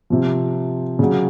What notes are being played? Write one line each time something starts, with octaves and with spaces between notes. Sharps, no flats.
C3 F3
C#3 F#3